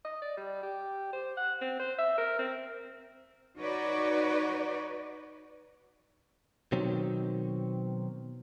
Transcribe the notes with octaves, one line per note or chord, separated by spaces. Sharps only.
D#5
D5
G3
G4
C5
F#5
C4
C5
E5
A#4
C4
D#4 F#4 B4 C#5 D5
B2 D#3 F#3 C4